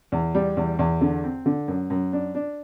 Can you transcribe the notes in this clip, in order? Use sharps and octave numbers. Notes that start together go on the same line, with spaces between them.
E2
G3
E2
E2
D3
C4
D3
F#2
F#2
D4
D4